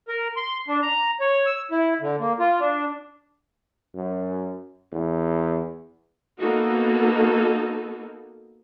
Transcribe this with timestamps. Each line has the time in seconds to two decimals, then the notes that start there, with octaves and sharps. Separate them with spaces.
0.08 A#4
0.37 C6
0.68 D4
0.82 A#5
1.20 C#5
1.46 E6
1.71 E4
2.01 D3
2.20 A#3
2.39 F4
2.60 D4
3.95 F#2
4.92 E2
6.39 A#3 B3 D#4 F#4 A4